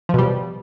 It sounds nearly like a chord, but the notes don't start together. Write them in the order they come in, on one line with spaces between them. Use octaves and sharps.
F3 B2 G3